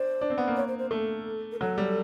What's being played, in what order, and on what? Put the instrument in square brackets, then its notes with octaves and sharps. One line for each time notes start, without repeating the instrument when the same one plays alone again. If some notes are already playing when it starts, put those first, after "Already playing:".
Already playing: [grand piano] D4 [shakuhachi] C5
[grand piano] D4
C4
B3
A#3
[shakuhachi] C#5
C5
C5
[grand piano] A3 [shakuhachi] A4
[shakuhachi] A#4
[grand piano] F#3 [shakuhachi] A4
[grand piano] G3